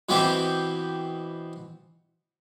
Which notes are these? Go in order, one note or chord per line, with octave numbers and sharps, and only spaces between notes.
B2 E3 B3 C4 G4